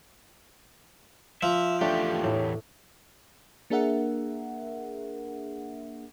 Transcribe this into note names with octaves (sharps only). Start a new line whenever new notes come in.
F3 E5
E2 A3 D4 G4
A2
A#3 D4 G#4 A#4 E5 F#5